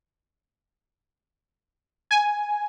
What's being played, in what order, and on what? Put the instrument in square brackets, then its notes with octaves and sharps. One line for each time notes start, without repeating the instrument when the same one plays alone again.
[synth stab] G#5